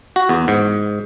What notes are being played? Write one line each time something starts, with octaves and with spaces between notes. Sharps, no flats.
F#4
E2
G#2